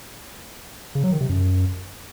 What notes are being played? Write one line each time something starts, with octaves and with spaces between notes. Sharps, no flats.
C#3
F#3
D#3
C3
F#2